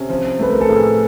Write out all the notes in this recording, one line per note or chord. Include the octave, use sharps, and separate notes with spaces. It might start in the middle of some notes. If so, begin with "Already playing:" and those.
Already playing: C3 C#4
F3
A3 B4
A#4
A4
A2 G#4